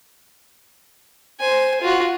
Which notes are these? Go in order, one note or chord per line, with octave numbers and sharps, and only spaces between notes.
C5 G#5
F4 F#4